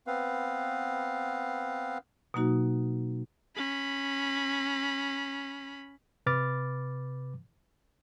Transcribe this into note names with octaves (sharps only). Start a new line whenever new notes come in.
B3 C4 B4 F5
B2 F#3 A#3 D#4 F#4
C#4 B5
C3 B4 B5 D6 F6 A6